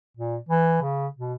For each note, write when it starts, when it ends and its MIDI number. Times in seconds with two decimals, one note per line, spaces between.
0.17 0.36 46
0.49 0.79 52
0.82 1.07 49
1.18 1.34 47